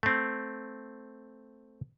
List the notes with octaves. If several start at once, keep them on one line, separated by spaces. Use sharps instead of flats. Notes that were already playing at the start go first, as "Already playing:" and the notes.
A3 C4